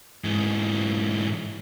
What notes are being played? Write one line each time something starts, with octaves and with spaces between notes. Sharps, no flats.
G#2 E3